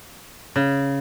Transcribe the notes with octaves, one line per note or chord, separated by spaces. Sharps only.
C#3